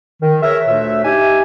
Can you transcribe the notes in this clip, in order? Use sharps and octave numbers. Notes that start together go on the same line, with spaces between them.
D#3
G#4 A#4 B4 C#5 E5
D2 A#2 A3 D4 C#5 E5
D#4 G4 E5 G#5